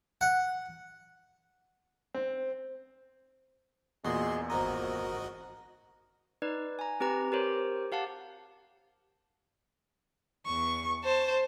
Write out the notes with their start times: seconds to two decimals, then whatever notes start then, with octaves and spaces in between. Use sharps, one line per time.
0.21 F#5
2.14 C4
4.04 E2 A#2 F#4 G#4 D#5 C6
4.50 G#1 F#4 A#4 C5 D#5 A#5
6.42 D#4 B4 D5
6.79 G#5 A#5
7.00 C4 G4 B4 A#5
7.32 G4 A#4 C5 C#5
7.92 G4 F5 F#5 A5
10.45 E2 C#6
11.04 C5 A5